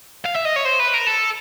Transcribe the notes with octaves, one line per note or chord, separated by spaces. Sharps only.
F5
E5
D#5
C#5
C5
B4
A#4
A4